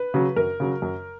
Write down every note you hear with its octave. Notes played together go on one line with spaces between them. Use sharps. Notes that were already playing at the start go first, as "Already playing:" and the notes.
Already playing: B4
C#3 F#3
F#2 A#4
C#3 F#3
F#2